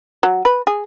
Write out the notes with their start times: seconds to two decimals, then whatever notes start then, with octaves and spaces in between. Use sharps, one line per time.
0.23 F#3
0.45 B4
0.67 G#4